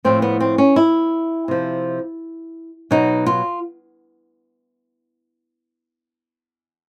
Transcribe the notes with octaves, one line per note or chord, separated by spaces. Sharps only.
A2 F3 C4
B3
C4
C#4
E4
C3 F3
B2 F#3 D#4
F4